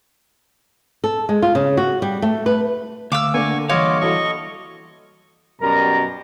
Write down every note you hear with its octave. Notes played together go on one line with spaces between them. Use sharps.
A4
G#3
F4
C#3
F#4
G3
A3
B4
D2 F5 D6 E6
D3 A#3 D4 G#5 C#6
E3 G3 F4 C#5 D#5 F5 D6
F#3 E4 A4 D#5 C#6
F#2 B2 G3 A#4 A#5